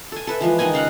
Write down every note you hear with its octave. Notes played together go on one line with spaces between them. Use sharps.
A4 G#5
A4 B4 E5
E3 F3 G#3
D#3 D#4 D#5 G#5
C#3 F5 F#5 A#5